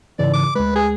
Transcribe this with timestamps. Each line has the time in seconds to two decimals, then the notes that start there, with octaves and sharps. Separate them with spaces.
0.19 G#2 C#3 E3 D5
0.34 D6
0.56 D2 G#3 B4
0.76 G#4